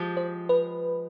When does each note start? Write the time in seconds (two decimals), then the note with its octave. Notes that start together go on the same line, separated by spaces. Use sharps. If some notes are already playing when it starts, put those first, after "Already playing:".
Already playing: F3 G#3 G4
0.17 C5
0.49 B4